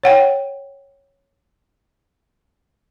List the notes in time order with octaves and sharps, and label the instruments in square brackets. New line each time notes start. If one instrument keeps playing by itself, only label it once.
[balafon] C#5 F#5 G5